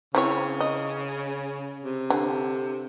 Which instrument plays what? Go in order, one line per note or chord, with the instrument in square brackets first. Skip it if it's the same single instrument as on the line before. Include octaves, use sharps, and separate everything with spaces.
[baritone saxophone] C#3 [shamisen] C4 E4 C#5
[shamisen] D#5
[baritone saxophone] C3
[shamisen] D3